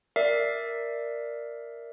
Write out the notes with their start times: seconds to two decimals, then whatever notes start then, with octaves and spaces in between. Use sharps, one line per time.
0.16 A#4 D5 E5 C7